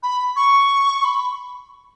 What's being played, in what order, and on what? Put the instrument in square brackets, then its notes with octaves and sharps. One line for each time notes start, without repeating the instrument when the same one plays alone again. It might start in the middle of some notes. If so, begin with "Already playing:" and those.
[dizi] B5
C#6
B5